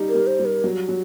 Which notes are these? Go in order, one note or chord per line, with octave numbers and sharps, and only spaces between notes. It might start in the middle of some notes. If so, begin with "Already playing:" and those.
Already playing: G3 D#4
A#4
G3
C5
G3
A#4
F#3
F#3